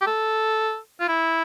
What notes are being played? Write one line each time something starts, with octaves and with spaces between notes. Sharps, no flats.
G4
A4
F4
E4